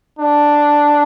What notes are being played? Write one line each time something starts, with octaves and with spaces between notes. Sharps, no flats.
D4